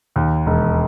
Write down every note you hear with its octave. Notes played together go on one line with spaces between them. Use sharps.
D#2
E1